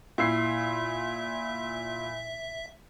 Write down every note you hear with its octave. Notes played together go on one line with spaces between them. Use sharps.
A#2 E4 E5 C7